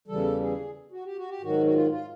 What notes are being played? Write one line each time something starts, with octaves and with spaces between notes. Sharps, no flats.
E2 C#3 E3 G3 A4
G#4
F#4
G4
F#4
G4
G#2 D#3 F#3 F#4
F#4
F4
F4